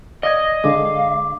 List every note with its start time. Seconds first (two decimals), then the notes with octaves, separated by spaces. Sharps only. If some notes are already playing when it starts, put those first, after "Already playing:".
0.23 D5 D#5 D#6 G#6
0.64 D3 G#3 F5 D6